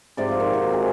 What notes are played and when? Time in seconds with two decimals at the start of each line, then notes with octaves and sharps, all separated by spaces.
0.17 G#2 C3 D5
0.29 F3 F4
0.40 D#3
0.53 C3 F#4
0.71 C4 G#4